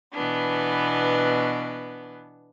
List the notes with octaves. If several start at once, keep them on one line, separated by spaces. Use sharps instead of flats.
B2 E3 B3 D4